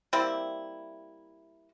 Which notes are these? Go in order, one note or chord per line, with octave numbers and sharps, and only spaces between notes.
G3 A#3 C4 E4